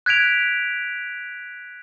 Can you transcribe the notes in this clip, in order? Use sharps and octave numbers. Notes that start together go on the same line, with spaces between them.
F#6 G#6 B6 D7 F7